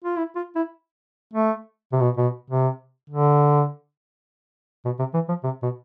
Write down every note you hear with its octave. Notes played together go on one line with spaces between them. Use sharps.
F4
E4
F4
E4
A3
C3
B2
B2
C3
D3
B2
C3
E3
F3
C3
B2